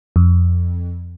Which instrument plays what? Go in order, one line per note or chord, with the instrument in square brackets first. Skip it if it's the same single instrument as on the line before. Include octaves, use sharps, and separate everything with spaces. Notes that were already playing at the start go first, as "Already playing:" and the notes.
[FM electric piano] F2